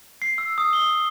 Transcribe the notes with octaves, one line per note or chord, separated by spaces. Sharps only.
C7
E6
D#6
G7